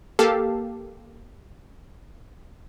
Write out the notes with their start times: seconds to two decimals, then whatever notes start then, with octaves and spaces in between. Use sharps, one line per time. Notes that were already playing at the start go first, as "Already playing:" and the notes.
0.19 A#3 G4 A4 F5 A5